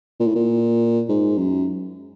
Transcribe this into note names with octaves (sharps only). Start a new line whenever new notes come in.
A#2
A2
A#2
G#2
F#2